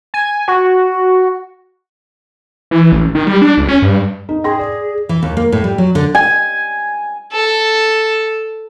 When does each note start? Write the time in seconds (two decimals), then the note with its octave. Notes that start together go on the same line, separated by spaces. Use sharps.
0.14 G#5
0.48 F#4
2.71 E3
2.92 A1
3.15 D#3
3.27 G3
3.42 D4
3.57 C#2
3.69 C#4
3.82 G2
4.29 D#4
4.44 G#4 G5 C6 A#6
4.59 D5
5.09 E3
5.23 D#2
5.37 A#3
5.52 A2
5.64 G3
5.78 F#3
5.95 D3
6.15 G#5
7.32 A4